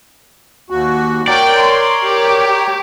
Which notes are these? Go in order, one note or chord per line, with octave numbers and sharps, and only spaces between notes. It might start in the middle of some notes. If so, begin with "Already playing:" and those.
D#2 F#4
A#4 C#5 D5 G5
C6
G4